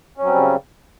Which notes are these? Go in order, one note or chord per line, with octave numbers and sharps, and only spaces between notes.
C#3 F#3 G3 C4 C#4